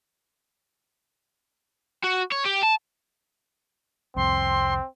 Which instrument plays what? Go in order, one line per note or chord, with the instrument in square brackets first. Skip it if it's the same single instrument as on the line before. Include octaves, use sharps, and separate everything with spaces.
[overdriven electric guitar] F#4
C#5
G4
A5
[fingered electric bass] C2 F2 [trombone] C4 [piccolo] C6